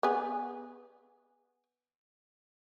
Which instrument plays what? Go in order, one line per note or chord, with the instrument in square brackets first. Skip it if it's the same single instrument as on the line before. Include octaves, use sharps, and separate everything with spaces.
[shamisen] B3 G#4